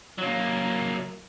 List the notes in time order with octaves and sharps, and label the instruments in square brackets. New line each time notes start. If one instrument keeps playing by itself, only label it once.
[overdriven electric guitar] F#3 A#3